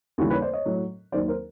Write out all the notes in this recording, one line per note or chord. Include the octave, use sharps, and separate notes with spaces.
D#2 C#3 E3 G3 F#4 G#4
B4 C#5
C5 D5
C#5 D#5
A2 F#3
D#2 D#3 F#3 C5 D5
A#4 C5